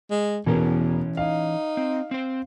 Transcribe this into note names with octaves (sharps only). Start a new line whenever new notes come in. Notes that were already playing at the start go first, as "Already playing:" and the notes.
G#3
E2 B2 E3 C#4 A#4
D#4 F5
C4
C4 C5